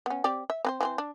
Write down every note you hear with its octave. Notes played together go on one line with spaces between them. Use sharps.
B3 C#4
C4 G4 D5
E5
C4 B4 C5
E3 C4 C5
D4